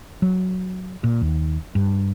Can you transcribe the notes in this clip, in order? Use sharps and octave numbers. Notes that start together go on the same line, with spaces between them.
F#3
A#2
D#2
G2